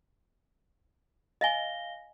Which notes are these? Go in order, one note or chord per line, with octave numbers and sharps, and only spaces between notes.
D#5 F5 G#5 A#6 G7